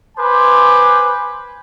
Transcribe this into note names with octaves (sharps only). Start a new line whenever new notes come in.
B4 C5 G#5 D6